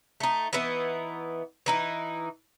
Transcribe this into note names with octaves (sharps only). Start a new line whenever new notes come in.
A3 D#4
E3 B3 D#4 E4
E3 D#4 E4